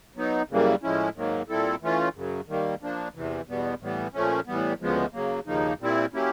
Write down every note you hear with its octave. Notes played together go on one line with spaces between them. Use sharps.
F#3 B3 D#4
F#2 C#3 E3 G3 A#3
A2 F3 G#3 C#4 E4
G#2 D#3 F#3 A#3
A#2 G3 C4 E4 A4
E3 A3 C#4 F4
F#2 C#3 F#3
D#3 G3 A#3
F3 A#3 D4
E2 C3 E3
E2 B2 G3 B3
A2 E3 G3 B3
A#2 F3 A3 C#4
A2 E3 G3 B3
D2 C#3 F3 G#3 B3
C#3 F#3 A#3
D#2 C#3 F3 A#3 D#4
A#2 G3 C4 E4
F#3 A#3 C#4 E4 G4